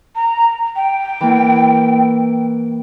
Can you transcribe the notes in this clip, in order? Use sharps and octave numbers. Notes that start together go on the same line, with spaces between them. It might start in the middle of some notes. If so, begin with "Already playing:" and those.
A#5
G5
E3 A#3